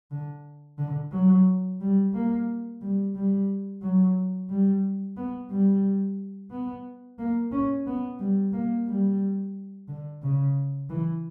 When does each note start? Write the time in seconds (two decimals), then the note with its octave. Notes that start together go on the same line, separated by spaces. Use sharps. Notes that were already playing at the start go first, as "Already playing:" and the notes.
0.11 D3
0.78 D3
1.12 F#3
1.80 G3
2.13 A#3
2.81 G3
3.15 G3
3.82 F#3
4.50 G3
5.17 B3
5.50 G3
6.51 B3
7.19 A#3
7.52 C#4
7.87 B3
8.20 G3
8.53 A#3
8.87 G3
9.88 D3
10.22 C#3
10.90 E3